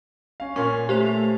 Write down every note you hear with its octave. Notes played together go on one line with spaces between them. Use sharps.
C#4 F5
A#2 C#4 A#4 C#6
A3 G4 C5 F7